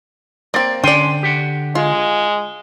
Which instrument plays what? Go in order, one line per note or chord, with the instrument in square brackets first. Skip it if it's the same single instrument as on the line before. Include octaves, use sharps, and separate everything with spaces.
[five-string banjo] A#3 C4 [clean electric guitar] D5
[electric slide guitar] D3 [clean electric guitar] C#4 G#5 C6 [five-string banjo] D5 G5
[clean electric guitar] G4 F#5
[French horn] G#3 [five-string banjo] F4